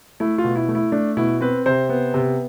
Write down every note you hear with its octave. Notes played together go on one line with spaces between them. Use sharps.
A3 E4
F4
B2
E4
A3
E4
A3 D4
B2 E4
C4 B4
C3 C5
B3
C3